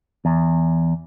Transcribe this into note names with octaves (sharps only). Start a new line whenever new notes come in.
E2